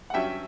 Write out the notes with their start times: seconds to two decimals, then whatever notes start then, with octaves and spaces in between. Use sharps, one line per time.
0.10 F#5
0.14 G2 F#3 C#4 E5 G5